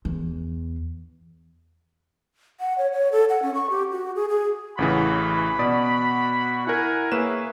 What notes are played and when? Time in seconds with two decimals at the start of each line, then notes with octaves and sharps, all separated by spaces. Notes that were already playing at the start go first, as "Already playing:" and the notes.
0.05 E2
2.60 F#5
2.78 C#5
2.93 C#5
3.12 A4
3.29 F#5
3.42 C#4
3.55 C#6
3.70 G4
3.92 F#4
4.16 G#4
4.29 G#4
4.78 A1 C#3 E3 F#4 B5
5.59 B2 D5 D#6
6.67 E4 A#4 F#5 G#5
7.12 A#3 G#4 B4 C#5 E5 E7